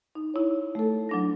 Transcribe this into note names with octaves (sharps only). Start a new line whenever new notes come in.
D#4
E4 C#5
A3 A4
F#3 D4 A#6